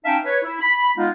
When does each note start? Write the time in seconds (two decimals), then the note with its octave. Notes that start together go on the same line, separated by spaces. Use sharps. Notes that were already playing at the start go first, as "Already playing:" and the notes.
0.04 C#4 D#4 E5 F5 G5 A5
0.24 B4 C#5
0.42 E4
0.60 B5
0.96 G#3 B3 D#4 F4